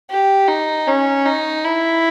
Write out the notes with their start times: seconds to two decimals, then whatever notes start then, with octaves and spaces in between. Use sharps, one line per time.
0.10 G4
0.48 D#4
0.87 C#4
1.26 D#4
1.64 E4